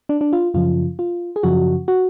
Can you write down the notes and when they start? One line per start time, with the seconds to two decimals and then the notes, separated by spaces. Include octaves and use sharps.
0.09 D4
0.21 D4
0.33 F4
0.54 F#2 C#3 F3 F4
0.99 F4
1.36 G#4
1.43 F#2 C#3 F3 F#4
1.88 F#4